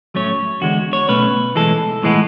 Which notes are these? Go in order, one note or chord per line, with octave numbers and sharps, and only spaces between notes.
A2 F#3 A3 C#4 C#5
E2 D3 G#3 F#4
C#5
B1 B2 A3 C#4 B4
B1 A2 E3 G#3 A4
B1 A2 E3 G#3 B3